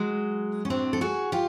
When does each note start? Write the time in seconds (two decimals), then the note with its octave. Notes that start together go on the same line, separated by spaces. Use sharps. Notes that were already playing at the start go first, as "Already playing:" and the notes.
Already playing: F#3 G#3
0.65 C#4
0.70 A2 F#3 C4 D4
0.93 A4
1.01 F#4 G#4
1.32 F4 G4